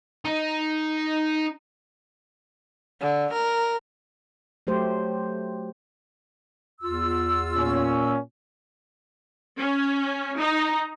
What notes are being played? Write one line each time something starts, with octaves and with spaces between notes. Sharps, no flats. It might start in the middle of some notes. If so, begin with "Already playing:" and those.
D#4
D3
A#4
F#3 A3 G4 C5
E2 F4 E6
A#2 C#4
C#4
D#4